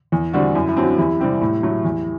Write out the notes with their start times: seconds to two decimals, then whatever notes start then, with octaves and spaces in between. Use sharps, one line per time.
0.12 E2 E4
0.33 D3 G3 C4 F#4
0.55 F#2 E4
0.69 E4
0.77 F#3 C4
0.84 D4 F#4
0.98 E2 E4 G4
1.20 C3 G3 C4 G4
1.41 A2 E4
1.63 F#3 A3
1.84 E2